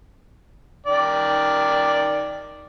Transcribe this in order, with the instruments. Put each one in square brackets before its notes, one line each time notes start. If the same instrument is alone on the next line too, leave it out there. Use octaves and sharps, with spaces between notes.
[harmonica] D#3 D5 G5